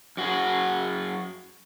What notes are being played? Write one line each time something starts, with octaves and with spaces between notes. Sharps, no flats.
F#2 F#4 G#4